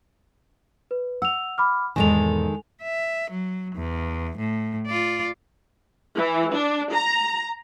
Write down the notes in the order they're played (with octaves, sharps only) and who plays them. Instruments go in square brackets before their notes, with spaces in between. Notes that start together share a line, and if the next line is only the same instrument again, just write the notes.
[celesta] B4
[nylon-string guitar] F#5 [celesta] E6 F7
[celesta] B5 D6 F6
[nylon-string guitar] E2 G#2 B2 [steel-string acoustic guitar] D#3 G#3 A4 [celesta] G#5 F7
[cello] E5
F#3
E2
A2
F4 D5
[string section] E3
D4
A#5